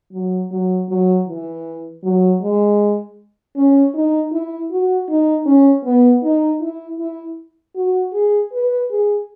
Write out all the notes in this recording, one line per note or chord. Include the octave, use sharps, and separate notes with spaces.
F#3
F#3
F#3
E3
F#3
G#3
C#4
D#4
E4
F#4
D#4
C#4
B3
D#4
E4
E4
F#4
G#4
B4
G#4